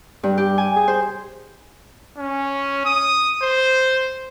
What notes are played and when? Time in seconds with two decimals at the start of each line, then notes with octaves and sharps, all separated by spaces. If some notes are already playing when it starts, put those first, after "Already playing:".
0.23 G2
0.38 G4
0.58 G#5
0.76 G#4
0.88 C5
2.18 C#4
2.85 D#6
3.43 C5